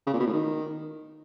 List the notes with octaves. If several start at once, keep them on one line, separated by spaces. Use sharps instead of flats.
C#3
A#2
B2
A2
D#3